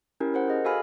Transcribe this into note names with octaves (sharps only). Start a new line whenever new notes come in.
C#4 E4 G4 A#4
A#4 C5 F#5
G#4 D#5
F#4 A4 F5 G#5 B5 F6